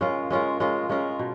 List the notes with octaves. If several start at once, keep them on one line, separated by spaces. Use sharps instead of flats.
G#3 C#4 F4 A#4
G#3 C#4 F4 A#4
G#3 C#4 F4 A#4
G#3 C#4 F4 A#4
B2